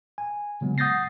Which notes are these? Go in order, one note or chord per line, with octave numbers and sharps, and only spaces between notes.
G#5
C#3 F#3 G#3 B3
F#5 D#6 G6 A6 A#6 C7